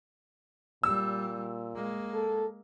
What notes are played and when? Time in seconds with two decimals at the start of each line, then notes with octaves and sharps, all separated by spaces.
0.83 A#2 G3 E6
1.75 G#3 A#3
2.14 A4